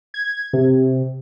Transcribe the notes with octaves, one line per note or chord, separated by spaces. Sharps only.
G#6
C3